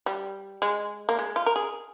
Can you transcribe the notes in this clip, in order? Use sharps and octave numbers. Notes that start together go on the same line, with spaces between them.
G3
G#3
A#3
G#3
F4
A#4
G#4